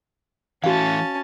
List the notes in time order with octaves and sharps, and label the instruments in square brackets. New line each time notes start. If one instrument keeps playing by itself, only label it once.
[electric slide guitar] E3 A3 [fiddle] C#4 A5 [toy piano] F#4 F5